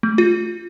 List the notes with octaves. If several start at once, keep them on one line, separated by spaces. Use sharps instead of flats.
A3
F4